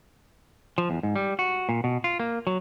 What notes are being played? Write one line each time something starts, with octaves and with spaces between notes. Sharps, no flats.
F3
E2
G#2
G3
F#4
A#2
B2
F4
A#3
F#3